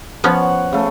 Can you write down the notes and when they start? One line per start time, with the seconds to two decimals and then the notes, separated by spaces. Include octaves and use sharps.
0.24 F3 B3 C#4 C#5 F#5
0.73 C#3 A3